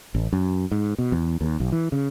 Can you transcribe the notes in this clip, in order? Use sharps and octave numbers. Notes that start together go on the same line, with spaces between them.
A1
F#2
G#2
B2
E2
D#2
B1
E3
C#3